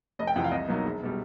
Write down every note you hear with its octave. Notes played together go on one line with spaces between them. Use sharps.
F1 D#5
G5
F2 C3 E3 F#5
F5
C2 D#5
B2 F#3 A#3 D#4
E1
B2 G3